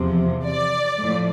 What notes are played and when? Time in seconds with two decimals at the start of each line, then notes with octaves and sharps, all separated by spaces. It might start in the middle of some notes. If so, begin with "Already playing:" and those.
Already playing: E2 C3 F3
0.46 D5
0.99 A2 F3